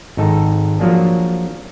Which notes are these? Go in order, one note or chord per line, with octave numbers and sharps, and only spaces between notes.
G#1 D#4 A4
F3 F#3 A#3 D4 G#4